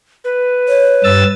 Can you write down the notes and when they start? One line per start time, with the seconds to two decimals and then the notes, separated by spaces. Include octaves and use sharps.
0.24 B4
0.68 C#5
1.04 G2 E6 A6